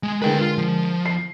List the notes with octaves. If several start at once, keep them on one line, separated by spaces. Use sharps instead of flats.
G#3
D3 G#3 A#4 B4 G5
F4
F3
C7